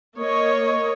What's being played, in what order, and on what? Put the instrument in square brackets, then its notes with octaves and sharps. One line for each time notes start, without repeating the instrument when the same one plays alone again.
[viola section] A#3 C#5 D#5